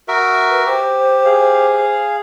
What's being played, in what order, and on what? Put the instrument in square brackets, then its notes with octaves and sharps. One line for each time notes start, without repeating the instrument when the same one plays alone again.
[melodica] F#4 A#4 E5
[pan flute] B4
[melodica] G4 [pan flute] C5
[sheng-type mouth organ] G#4 F5